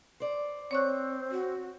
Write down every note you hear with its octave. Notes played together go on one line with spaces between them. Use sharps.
C5 D5
C4 C#5 C#6 F#6
F#4